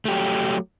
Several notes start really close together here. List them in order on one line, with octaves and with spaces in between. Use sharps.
A3 G4 F#3